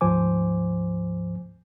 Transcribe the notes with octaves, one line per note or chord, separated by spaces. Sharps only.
D2 G#2 F3 C5 G#5 D6